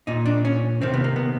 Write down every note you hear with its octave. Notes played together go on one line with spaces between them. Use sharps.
A#2 D#4
D4
C#4
C3 D#3 C4
B3
A#3
B3